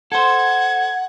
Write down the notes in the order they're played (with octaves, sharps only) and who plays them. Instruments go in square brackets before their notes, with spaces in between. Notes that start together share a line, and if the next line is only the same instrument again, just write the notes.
[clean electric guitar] A4 C5 [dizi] F#5 [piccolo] G#6